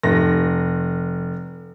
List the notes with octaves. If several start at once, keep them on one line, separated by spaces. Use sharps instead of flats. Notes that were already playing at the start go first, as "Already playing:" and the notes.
F1 A#6